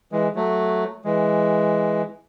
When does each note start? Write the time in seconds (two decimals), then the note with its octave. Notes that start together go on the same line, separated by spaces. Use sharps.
0.12 E3 G#3
0.35 F#3 A3
1.04 E3 G#3